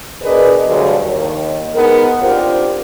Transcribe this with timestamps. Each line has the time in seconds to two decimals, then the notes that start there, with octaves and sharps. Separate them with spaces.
0.23 B2 D4 G#4 A#4 B4 D#5
0.67 D2 G2 B2 D3 F#3 G#4
1.01 D#2
1.75 G#3 B3 D#4 A#4
2.22 C4 D4 F4 G4 A#4 C5